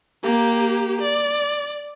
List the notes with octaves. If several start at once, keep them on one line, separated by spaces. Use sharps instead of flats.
A#3 G4
D5